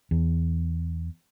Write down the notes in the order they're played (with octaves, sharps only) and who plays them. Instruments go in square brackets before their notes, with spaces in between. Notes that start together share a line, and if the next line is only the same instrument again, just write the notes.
[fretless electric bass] E2